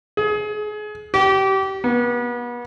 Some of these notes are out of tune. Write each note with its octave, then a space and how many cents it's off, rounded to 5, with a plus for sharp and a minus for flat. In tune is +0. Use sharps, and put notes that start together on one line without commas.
G#4 +30
G4 -25
B3 -35